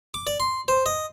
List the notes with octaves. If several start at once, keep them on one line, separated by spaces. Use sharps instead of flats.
D6
D5
C6
C5
D#5